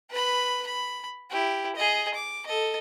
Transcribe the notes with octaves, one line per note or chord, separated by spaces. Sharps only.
B4 B5
B5
E4 G4
G#4 D#5
D6
A4 D#5